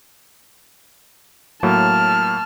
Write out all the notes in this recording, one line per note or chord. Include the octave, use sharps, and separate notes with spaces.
A2 F#3 A#3 A5 F6